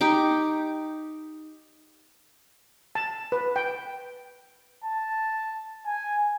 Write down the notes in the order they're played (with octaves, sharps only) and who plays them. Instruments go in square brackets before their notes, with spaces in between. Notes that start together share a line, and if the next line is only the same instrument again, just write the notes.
[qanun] D#4 G4 D6
[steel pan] A5
B4
G5
[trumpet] A5
G#5